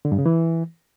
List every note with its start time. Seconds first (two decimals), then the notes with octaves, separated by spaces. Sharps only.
0.05 D3
0.12 G2
0.19 C#3
0.26 E3